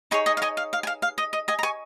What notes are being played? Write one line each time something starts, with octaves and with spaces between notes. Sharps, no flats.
D#4 G#4 C#5 G#5 C#6
D#5 G#5
F5
D#5 G#5
F5
F5
G#5
F5
F5
D#5
D#5
D#5 G#5
A#5
G#5 C#6